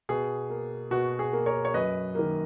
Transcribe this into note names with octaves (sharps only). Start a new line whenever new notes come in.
B2 G#4
A#3
B2 F#4
G#4
A#3
A#4 C#5
C#5
F#2 B4 D#5
D#3 A#3